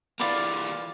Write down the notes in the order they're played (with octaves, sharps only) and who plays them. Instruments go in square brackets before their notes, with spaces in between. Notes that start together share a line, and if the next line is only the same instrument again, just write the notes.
[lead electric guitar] E3 A#3 [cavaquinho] F4 D5 B5